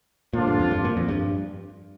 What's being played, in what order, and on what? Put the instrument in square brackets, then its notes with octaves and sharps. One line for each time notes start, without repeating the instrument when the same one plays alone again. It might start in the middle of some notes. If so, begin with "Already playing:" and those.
[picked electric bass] A#2 [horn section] D3 F3 D4 F4
[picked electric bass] G2
F2
G2
A#2
F2
G2